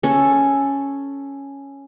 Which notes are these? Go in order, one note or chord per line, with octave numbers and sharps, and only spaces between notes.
C#4 A4